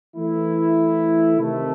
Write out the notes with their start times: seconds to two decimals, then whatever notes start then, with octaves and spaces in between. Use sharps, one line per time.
0.16 E3 A3 E4
1.39 C3 D#3 A3